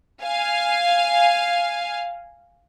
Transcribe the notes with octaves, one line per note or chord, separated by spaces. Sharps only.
F5 G#5